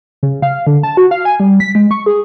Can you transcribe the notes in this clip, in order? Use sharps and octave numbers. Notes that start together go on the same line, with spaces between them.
C#3
F5
D3
A5
F#4
F5
G#5
G3
B6
G#3
C#6
G#4